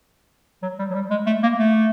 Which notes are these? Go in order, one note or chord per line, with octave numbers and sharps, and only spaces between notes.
F#3
G3
F#3
G3
G#3
A3
A#3
A3